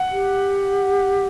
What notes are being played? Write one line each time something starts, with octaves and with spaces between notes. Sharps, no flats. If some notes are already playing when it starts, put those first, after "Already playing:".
Already playing: F#5
G4